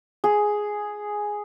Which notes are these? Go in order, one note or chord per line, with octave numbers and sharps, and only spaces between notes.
G#4